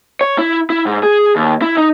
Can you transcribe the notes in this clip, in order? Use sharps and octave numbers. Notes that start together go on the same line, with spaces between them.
C#5
E4
E4
G#2
G#4
D#2
E4
D#4